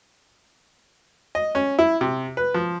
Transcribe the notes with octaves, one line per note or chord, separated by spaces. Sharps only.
D#5
C#4
E4
C3
B4
F3